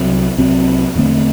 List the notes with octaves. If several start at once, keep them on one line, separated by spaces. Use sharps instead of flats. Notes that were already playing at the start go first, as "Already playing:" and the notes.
Already playing: C2 C3 F#3 C4
C2 C3 F#3 C4
E2 D3 A3 C4